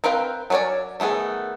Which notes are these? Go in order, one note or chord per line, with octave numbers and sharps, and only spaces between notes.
C4 A#4 B4 F5 G5
F#3 B3 C#4 C#5 D5
D#3 A3 B3 G#4